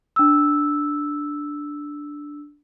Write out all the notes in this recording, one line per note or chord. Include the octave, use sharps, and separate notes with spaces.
D4 E6